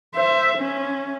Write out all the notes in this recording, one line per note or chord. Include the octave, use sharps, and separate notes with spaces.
C5 E5
C#4